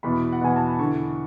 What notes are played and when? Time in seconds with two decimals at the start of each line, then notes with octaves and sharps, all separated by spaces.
0.03 E2 B2 B5
0.32 F#5
0.41 E2 B2 G#5
0.56 A5
0.67 B5
0.79 E2 D3 C#6